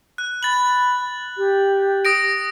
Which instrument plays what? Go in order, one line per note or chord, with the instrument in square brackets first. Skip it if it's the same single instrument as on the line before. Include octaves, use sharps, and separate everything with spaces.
[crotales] F#6
[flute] B5 [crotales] A6 F#7
[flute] G4
[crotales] D#6 A#6 D7